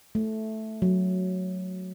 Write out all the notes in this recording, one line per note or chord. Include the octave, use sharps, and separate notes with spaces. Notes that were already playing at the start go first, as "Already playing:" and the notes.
A3
F#3